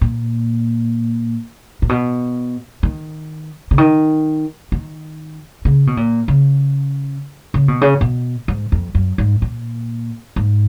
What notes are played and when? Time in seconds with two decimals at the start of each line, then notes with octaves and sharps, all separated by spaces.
0.01 A#2
1.82 A#2
1.89 B2
2.83 D#3
3.71 C#3
3.78 D#3
4.72 D#3
5.65 C#3
5.87 B2
5.97 A#2
6.28 C#3
7.54 C#3
7.68 B2
7.81 C#3
8.01 B2
8.48 G#2
8.72 F2
8.95 F#2
9.18 G#2
9.42 A#2
10.36 G#2